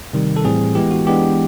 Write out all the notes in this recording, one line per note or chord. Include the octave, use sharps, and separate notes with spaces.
C3 D#3 G3
A4
A2 E3 G3 C4 G#4
E3 G#3 B3 G4
F#4
E3 G#3 B3 D4 G4